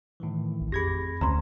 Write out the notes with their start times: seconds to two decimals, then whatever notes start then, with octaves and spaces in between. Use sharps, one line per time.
0.20 A2 D#3 E3
0.61 A1
0.72 F2 G4 G#4 B5 G#6 A#6
1.21 D2 C#4 A#5 C6